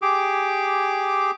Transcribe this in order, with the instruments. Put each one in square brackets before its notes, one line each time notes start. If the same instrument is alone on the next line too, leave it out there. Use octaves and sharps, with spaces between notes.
[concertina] G4 G#4 D6